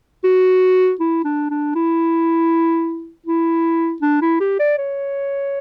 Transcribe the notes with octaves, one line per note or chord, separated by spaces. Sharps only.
F#4
E4
D4
D4
E4
E4
D4
E4
G4
D5
C#5